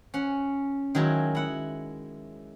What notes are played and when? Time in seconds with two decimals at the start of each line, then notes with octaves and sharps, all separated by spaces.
0.14 C#4 F#5
0.95 D#3 F#3 G#3 E4
1.35 E4 F#5